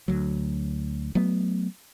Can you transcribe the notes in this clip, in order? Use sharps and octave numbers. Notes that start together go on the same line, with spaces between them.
D2 F#3
F#3 A3 B3